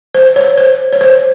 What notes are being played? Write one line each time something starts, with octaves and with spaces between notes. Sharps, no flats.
C5
C#5
C5
C#5
C5